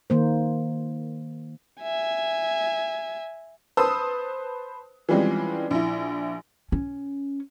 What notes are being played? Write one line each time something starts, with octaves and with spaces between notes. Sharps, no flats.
D#3 A#3 C5
E5 G#5
B4 C5 A5 D#6 E6
E3 F3 G3 G#3 C4 C#4
A#1 E4
C#4